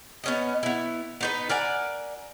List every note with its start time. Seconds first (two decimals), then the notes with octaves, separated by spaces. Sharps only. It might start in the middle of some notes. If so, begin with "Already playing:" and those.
0.24 B3 C#4 D#5
0.63 B3 E4
1.21 B3 D#4 B4
1.49 A#4 D5 F#5 G#5